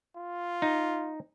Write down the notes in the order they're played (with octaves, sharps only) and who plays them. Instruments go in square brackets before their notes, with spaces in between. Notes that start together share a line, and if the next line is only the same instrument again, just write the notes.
[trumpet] F4
[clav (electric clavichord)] D#4